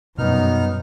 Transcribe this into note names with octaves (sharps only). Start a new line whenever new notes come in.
F#2 B2 G3 B3 D#4 F6